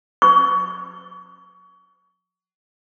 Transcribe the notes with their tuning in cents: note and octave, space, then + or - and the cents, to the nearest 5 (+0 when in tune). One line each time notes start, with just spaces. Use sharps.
C#6 +30